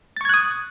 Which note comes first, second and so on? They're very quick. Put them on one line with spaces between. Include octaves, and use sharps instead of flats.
A6 C#6 G#6 F#6 D#6